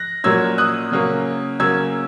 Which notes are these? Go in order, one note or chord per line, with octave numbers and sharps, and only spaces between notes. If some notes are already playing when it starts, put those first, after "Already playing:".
Already playing: F#6 A#6
A#2 F#3 A#3 C#4 E6 G#6
D#6 F#6
C#3 F#3 A#3 C#4
C#3 F#3 A#3 C#4 E6 G#6